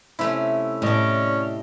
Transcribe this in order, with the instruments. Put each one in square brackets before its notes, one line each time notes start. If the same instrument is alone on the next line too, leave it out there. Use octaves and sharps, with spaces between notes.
[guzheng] C3 A3 C#4 [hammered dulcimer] E4
[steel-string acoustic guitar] A2 D5 [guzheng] G3 [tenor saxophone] C#4 [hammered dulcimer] D#5 A5